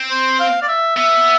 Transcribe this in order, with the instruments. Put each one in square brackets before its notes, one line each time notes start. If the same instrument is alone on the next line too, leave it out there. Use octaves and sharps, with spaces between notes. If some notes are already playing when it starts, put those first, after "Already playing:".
Already playing: [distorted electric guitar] C4
[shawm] C5
F5
D5
E5
[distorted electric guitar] B3 [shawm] E5